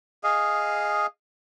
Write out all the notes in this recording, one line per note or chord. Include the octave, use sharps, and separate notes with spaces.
G#4 D#5 F5